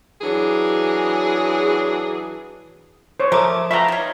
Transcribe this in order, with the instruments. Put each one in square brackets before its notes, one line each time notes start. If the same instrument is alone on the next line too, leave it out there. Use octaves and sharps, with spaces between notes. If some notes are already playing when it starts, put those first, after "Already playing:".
[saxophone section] E3 F#3 D4 G#4
[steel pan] C5 C#5
[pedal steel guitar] F3 D6 D#6 [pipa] A3 G4 A#4
[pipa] A3 B3 [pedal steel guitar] E5 F5 G5 [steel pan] A#5 B5
[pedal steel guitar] D#4 [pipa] F4 C#5